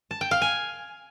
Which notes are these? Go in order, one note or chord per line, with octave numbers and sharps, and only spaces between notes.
A5
G5
F5
G#5